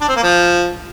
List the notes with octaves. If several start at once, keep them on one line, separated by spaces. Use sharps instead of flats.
D4
C4
A#3
F3